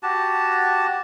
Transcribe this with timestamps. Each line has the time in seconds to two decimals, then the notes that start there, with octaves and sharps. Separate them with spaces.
0.03 F#4 G4 A5